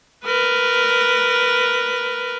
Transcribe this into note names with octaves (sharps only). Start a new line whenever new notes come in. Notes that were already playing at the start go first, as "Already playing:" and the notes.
A#4 B4